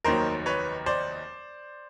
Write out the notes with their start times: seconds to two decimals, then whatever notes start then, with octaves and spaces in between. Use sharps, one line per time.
0.05 F1 D#2 D#3 F#3 A#4 C5
0.46 B4 C#5
0.86 C5 D5